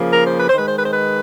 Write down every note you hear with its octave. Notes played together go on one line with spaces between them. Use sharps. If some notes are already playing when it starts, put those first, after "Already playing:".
Already playing: C#3 F3 A#3
A#4
C5
B4
C5
D#3 G#3 B4
C5
B4
C5
B4